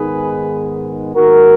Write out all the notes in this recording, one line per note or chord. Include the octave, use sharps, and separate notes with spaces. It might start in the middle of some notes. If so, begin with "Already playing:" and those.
Already playing: G#2 D#3 G#3 B3 G#4 B4
G#2 D#3 A#3 F#4 A#4